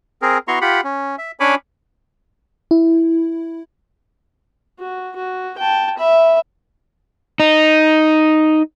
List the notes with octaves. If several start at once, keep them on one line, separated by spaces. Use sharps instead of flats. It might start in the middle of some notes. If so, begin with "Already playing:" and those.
C4 G#4 A#4
B3 E4 F#4 A#5 C6 C#6
F4 G4 F#5 B5
C#4
E5
C#4 D4 C#5 G#5 B5 D6
E4
F#4
F#4
G5 A5
E5 B5
D#4